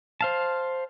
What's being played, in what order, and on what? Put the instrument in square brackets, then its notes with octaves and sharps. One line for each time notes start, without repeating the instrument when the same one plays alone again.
[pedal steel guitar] C5 F5 A5